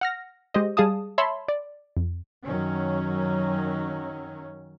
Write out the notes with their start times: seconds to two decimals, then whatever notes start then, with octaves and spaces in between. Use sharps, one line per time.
0.01 F#5 F6 A#6
0.54 G#3 G4 C5 D#5
0.77 G3 G#4 F5 A5 D#6
1.18 C#5 E5 A5 B5 C6
1.48 D5
1.97 F2
2.45 F#2 D#3 F#3 C#4